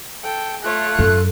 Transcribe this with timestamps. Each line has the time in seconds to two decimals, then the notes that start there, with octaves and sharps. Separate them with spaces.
0.24 A4 G5
0.62 A3 F4 C#5 F#6
0.99 F#2 A4